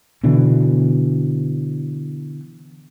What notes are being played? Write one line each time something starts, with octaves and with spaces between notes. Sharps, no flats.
B2 D3 E3